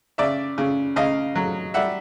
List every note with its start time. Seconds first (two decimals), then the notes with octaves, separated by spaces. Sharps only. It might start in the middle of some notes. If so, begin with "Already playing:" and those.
0.18 C#3 D5 E5
0.58 C#3
0.96 C#3 D#5 F5
1.35 F#3
1.74 G3 E5 F#5